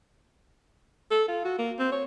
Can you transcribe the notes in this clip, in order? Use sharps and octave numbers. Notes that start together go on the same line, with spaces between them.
A4
F4
F#4
A#3
C4
C#5